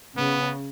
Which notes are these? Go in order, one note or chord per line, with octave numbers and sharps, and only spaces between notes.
C#3 B3